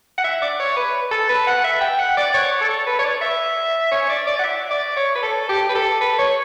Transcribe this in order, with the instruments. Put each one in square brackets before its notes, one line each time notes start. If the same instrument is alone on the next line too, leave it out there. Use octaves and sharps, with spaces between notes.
[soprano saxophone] F#5
E5
D5
C#5
B4
A4
B4
F#5
E5
G5
F#5
D5
C#5
A4
B4
C#5
D5
E5
C#5
D5
D5
F#5
E5
D5
C#5
B4
A4
G4
B4
A4
B4
C#5